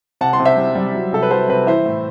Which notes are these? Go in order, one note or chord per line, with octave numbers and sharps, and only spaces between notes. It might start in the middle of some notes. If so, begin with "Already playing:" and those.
C3 F#5 A5
A5 C6
C3
C5 E5
G3
G3
F#3
C3 A4
B4
F#3 A4 C5
C3 B4
E3 C5 E5
A2